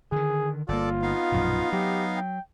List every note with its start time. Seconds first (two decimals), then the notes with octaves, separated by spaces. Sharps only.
0.12 D3 D#3 G#4
0.69 G1 A#3 F4 A4 D5
1.02 B3 D#4 F5
1.32 A#1 F#2 B2
1.72 F#3 G4
2.17 G5